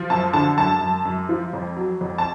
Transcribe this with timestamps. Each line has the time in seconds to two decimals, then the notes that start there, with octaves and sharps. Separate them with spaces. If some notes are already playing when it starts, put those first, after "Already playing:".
Already playing: F3
0.10 F#2 A5
0.33 D3 A5
0.58 F#2 A5
0.81 F#2
1.05 F#2
1.29 F3
1.53 F2
1.76 F#3
2.01 F2
2.18 A5